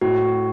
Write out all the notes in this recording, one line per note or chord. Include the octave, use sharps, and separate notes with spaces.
A2 F#4